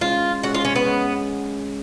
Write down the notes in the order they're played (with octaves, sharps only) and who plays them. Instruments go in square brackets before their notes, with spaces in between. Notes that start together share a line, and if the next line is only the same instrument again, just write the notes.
[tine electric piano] G#3 C#4 G#4 [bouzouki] F4
[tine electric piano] G#3 C#4 G#4 [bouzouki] F#4
[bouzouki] F4
C#4
B3
[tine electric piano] G#3 C#4 G#4